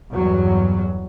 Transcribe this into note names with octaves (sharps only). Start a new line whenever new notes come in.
E2 G2 F#3